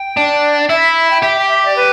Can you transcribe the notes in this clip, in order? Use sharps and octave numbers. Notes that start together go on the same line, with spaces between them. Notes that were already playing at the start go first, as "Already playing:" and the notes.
Already playing: G5
D4
E4 E5
G5
G4 E5
G5
E5
D5
B4